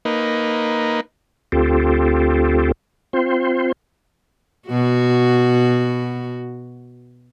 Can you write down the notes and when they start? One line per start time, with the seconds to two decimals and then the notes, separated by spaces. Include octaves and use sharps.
0.05 A#3 D#4 B4
1.52 D2 C4 F4 G4 A4
3.13 C4 F4 C5
4.69 B2 F#4